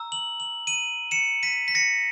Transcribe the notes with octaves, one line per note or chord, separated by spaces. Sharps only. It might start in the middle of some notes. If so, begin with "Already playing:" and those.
Already playing: A#5 E6
F#7
F#7
D#7 F#7
C#7 E7
B6 D#7
B6
A#6 C#7